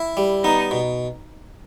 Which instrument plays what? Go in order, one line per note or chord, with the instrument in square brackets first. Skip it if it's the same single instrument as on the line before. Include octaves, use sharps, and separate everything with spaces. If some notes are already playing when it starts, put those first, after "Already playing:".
Already playing: [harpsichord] E4
G3
[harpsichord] B3 [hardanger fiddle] D#4
[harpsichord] B2